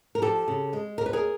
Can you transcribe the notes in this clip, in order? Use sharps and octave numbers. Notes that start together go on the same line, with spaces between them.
A#4
F3 G4 A4
C#3
G#3
D#2 A#4
B4
G#4 A#4